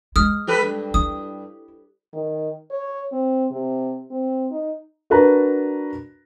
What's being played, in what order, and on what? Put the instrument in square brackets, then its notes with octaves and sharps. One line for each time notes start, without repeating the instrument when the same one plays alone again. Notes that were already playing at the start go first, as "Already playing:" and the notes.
[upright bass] G#3 [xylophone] D#6 F6
[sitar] G4 A4 B4
G2
[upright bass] E4 [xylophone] D#6
[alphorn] D#3
C#5
C4
C3
C4
D#4
[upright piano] D4 F#4 A#4 B4 A5 A#5